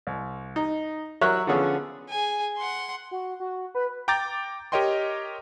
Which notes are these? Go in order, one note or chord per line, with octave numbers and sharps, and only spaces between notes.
C2
D#4
F#3 A#4 C#5 E5 F#6
D3 F3 B3 C#4 G#4 A4
G#4 G#5
F#5 C6
F#4
F#4
B4
G5 A#5 D6 G6 A6
G4 A#4 C#5 D#5 G5 C6